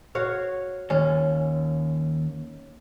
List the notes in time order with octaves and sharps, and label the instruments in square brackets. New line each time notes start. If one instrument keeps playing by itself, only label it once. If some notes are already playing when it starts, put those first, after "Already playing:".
[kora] F#4 C#5 F5
[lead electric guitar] D#2 [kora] C#4